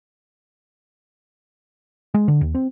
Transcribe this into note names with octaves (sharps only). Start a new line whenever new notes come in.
G#3
D3
D#2
C4